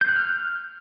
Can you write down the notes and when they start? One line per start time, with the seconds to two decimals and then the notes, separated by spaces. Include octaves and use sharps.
0.01 G6
0.09 F#6
0.16 F6